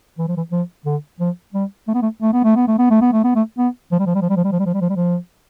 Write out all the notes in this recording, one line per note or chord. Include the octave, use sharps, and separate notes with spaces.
E3
F3
E3
F3
D3
F3
G3
A3
B3
A3
A3
B3
A3
B3
A3
B3
A3
B3
A3
B3
A3
B3
F3
G3
F3
G3
F3
G3
F3
G3
F3
G3
F3
G3
F3
G3
F3